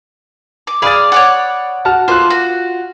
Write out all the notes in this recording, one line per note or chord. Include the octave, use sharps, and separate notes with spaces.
D6
G#4 D5 F5 B5 D#6 A6
C#5 D5 F#5
F#4 A5 F6
A3 A#3 F4 C5 F#6
F#4